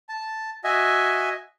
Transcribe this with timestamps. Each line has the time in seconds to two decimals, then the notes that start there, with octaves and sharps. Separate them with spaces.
0.09 A5
0.64 F#4 D#5 E5 G#5